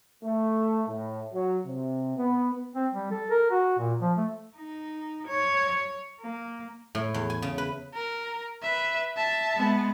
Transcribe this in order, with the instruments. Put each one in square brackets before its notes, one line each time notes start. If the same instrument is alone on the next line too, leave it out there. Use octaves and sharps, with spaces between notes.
[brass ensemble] A3
A2
F#3
C3
B3
[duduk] C4
G3
A4
A#4
F#4
A#2
F3
A3
[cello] D#4
C#5
A#3
[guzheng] A2
E2
G#5
C#3
B4
[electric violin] A#4
B4 E5
E5 A5
[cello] G#3 B3